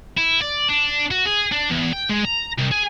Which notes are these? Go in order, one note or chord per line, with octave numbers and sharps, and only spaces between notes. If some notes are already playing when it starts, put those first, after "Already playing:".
E4
D5
D4
F#4
G#4
D4
E2
G5
G#3
A#5
C2
G#4